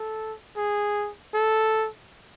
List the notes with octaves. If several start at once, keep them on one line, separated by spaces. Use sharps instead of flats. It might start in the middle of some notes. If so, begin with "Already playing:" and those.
Already playing: A4
G#4
A4